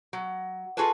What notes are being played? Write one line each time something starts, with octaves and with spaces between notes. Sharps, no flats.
F#3
F4 F#4 G#4 A4 B4